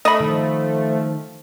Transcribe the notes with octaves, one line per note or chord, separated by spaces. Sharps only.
A3 D#5 B5
D#3 F3